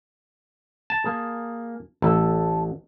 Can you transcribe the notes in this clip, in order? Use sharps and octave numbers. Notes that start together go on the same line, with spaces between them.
A5
A#3 G#4
A1 A4